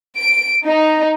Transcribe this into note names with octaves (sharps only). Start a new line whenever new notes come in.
D7
D#4